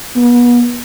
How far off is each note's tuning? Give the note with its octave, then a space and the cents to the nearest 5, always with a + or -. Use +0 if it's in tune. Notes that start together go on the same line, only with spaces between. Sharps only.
B3 -35